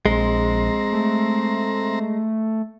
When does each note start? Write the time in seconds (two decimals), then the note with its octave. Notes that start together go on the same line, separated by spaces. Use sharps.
0.06 A#1 G#3 C4 A#5
0.93 A3